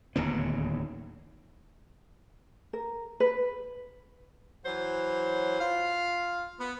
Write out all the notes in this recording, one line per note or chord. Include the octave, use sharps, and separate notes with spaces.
D1 D#2 C#3 B3
A#4
B4
E3 F#3 C5
F4 F5
B3